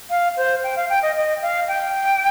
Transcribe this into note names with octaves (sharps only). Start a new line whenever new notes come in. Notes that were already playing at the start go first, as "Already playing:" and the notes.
F5
C5
G5
F5
G5
D#5
D#5
F5
G5